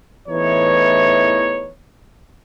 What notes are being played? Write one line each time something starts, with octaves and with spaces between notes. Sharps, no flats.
E2 A2 E3 D#4 C#5